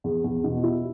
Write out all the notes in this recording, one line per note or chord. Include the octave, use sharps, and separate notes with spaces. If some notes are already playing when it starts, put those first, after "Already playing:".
E2
E2
B2
E4